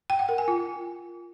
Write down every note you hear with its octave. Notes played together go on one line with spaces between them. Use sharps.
G5
F#5
A#4
G#5
F4